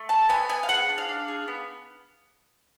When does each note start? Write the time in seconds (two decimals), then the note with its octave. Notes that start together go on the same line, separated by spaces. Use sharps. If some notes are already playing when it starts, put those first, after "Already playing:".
Already playing: A3
0.09 A4 A5
0.29 B3 G#5
0.49 B3 G#5
0.63 F5
0.69 G#4 F#5
0.89 D4
0.98 F5
1.09 D4
1.28 G#4
1.48 B3